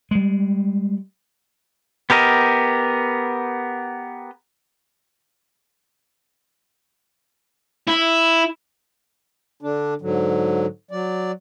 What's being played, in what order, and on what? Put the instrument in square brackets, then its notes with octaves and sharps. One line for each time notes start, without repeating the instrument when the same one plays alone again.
[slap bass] G3 G#3
[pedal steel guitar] B3 G4 A#4 D#5
[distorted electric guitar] E4
[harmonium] D3 D4
G#2 D3 F#3
F#3 D5